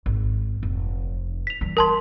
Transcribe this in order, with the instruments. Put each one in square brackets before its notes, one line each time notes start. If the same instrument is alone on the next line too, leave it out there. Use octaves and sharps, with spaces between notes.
[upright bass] G#1
F1
[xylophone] B6 F7
[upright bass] E3 G3
[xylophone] A#4 A5 C6